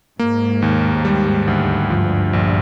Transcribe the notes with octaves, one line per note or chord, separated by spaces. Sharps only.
G#2 A#3
D#2
G3
D2
G2 F3
A#1